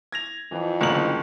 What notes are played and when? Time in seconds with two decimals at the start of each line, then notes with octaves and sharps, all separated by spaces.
0.12 G#6 A#6 F7
0.52 F2 E3
0.81 F#1 D2 D3 E3 F#7